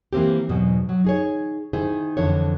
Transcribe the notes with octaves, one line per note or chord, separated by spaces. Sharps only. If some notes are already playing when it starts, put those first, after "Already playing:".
E3 A#3 C4 G4
E2 G#2 B2 F#3
F#3
D#4 G#4 C#5
D#3 E4 G#4 C5
F2 D3 E3 C#5